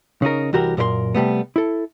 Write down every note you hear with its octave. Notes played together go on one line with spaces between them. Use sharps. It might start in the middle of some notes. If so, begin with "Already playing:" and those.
C#3 C#4 D#4 A#4
C2 E3 F#4 G4 A#4
F#2 A#2 A#4 B4 C6
C3 G3 A3 B3
E4 A4